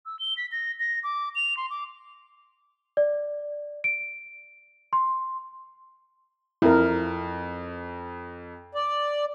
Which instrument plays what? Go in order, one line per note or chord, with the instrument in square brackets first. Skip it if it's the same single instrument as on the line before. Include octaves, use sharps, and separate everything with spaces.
[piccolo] E6
G7
B6
A#6
A#6
D6
F7
C6
D6
[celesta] D5
D7
C6
[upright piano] F2 [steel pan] E4 A#4
[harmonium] D5